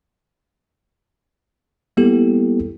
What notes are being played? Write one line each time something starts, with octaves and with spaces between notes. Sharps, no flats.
G3 A#3 B3 E4 G4 A4